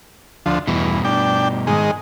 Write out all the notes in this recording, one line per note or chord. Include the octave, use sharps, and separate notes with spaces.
D2 F3
E2 G2 B2
D4 G5
G#2 D#3 G#3